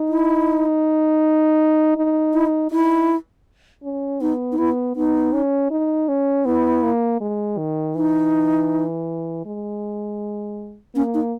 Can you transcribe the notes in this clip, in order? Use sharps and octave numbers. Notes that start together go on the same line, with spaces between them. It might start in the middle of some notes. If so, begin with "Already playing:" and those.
Already playing: D#4
E4
D#4
E4
D#4 E4
C#4
B3 D#4
D#4
B3 E4
B3 D#4
C#4
D#4
C#4
B3 E4
A#3
G#3
D#3
E3 D#4
G#3
A#3 C#4
D#4